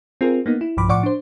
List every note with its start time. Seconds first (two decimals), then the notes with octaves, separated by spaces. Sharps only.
0.21 C4 F4 G#4 A#4
0.46 A#3 B3 D#4
0.61 E4
0.77 B1 G2 F3 B5 D6
0.89 A2 F3 D5 F#5 C#6 D6
1.03 D4 C5